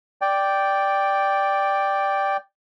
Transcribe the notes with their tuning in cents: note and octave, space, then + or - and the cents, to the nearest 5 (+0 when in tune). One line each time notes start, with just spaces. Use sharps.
D5 +0 G5 +0